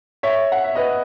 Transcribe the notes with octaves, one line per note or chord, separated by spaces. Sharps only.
C#5 E5
F#5
E5
B4 D#5